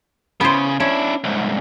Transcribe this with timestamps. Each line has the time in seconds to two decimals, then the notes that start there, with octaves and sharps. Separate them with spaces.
0.41 C#3 B3 E4 C5
0.80 C#4 D4 E4
1.24 C2 G#2